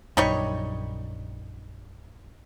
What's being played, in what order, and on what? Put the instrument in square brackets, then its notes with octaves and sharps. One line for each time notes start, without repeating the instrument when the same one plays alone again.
[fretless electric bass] A#1 F#2 [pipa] G3 D#4 C#5